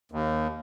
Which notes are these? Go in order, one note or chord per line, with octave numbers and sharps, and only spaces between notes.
D#2